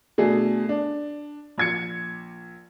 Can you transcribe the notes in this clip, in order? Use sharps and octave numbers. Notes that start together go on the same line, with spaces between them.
B2 A3 D4 G#4
D4
A#1 G#6 C#7